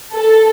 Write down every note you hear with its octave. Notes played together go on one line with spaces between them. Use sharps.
A4